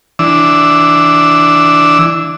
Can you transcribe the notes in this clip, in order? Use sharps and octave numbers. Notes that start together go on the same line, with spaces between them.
E3 D4 E6